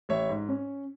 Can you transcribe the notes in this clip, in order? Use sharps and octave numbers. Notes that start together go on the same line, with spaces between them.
A1 C#5 E5
G#2
C#4